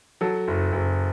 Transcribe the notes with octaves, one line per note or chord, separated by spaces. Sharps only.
F#3 A4
F#1
F#1